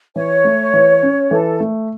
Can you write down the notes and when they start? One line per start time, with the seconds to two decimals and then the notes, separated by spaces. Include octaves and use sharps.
0.15 E3 C#5
0.44 A3
0.74 E3
1.03 C#4
1.31 E3 A4
1.60 A3